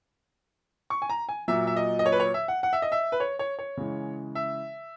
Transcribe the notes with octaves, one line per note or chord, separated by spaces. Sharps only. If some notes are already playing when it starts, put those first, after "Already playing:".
C#6
G#5
A#5
G#5
A#2 F#3 E5
E5
D#5
D#5
C#5
B4
C#5
E5
F#5
F#5
E5
D#5
E5
B4
C#5
C#5
C#5
C#3 E3 G#3
E5